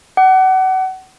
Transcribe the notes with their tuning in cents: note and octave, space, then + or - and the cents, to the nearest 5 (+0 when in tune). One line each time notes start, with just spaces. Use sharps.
F#5 +30 D6 +0